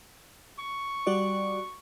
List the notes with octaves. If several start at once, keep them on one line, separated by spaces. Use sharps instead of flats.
C#6
G3 F#4 D5